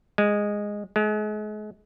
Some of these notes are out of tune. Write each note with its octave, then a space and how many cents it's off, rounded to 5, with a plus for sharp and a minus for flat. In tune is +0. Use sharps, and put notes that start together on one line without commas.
G#3 -10
G#3 +35